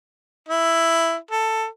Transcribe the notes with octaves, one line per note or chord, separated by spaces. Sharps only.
E4
A4